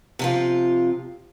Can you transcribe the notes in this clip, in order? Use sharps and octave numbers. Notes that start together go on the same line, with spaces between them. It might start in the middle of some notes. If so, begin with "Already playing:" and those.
C3 F3 F4